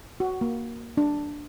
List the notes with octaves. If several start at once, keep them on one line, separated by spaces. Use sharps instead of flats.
F#4
A#3
D4